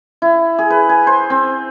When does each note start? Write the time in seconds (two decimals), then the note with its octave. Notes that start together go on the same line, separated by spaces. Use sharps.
0.22 E4
0.59 G#4
0.70 B4
0.89 G#5
1.07 C5
1.30 C4